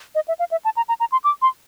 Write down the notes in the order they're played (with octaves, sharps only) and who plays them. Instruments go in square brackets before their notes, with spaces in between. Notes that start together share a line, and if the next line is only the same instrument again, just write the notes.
[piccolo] D#5
E5
F5
E5
A5
A#5
A#5
A#5
C6
D6
C6